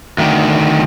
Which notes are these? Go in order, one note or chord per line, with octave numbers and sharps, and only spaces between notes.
D2 D#3